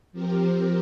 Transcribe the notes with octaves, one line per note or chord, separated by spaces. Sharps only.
F3 C4 G4 A#4